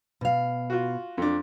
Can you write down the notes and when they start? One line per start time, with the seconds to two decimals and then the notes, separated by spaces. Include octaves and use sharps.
0.21 B2 F5
0.70 F4 F#4
1.18 F2 D4